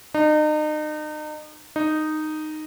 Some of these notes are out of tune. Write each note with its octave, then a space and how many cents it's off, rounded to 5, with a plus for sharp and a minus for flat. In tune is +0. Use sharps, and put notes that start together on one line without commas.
D#4 -35
D#4 -10